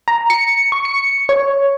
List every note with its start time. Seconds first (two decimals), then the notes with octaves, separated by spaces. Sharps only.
0.08 A#5
0.30 C#7
0.72 C#6
0.85 C#7
1.29 C#5